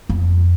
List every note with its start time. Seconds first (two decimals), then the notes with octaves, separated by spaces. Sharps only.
0.09 F2